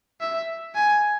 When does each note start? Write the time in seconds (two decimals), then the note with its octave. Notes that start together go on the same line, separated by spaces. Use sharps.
0.21 E5
0.75 G#5